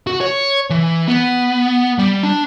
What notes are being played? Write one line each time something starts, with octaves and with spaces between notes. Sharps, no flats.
F#4
C#5
E3
B3
G3
D4